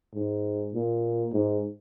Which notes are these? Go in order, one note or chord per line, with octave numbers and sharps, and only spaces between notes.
G#2
A#2
G#2